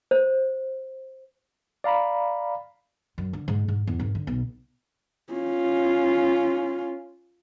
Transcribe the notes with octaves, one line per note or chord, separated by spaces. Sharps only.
C5
D5 F5 A#5 B5
F#2
D3
G#2
G#2
E2
G#1
D3
B1
C#4 F4